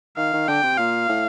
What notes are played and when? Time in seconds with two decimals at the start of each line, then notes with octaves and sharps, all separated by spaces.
0.17 D#3 F5
0.33 D#3
0.48 D3 G5
0.63 C3
0.78 A#2 F5
1.09 A2